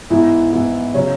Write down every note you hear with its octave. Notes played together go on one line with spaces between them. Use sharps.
G#2 E3 B3 E4
G#2 E3 B3 E4
C#3 F#3 C#4